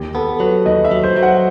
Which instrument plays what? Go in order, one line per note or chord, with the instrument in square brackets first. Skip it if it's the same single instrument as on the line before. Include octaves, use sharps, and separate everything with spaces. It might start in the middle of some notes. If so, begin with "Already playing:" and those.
Already playing: [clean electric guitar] D#2 [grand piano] G4
[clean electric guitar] B3 [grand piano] A4
[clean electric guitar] F#3 [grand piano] B4
[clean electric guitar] D#2 [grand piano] D#5
[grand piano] E5
[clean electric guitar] F#3
[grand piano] C5
[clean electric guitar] F#3
[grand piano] F#5